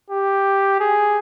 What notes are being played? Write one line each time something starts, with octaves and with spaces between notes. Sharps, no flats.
G4
G#4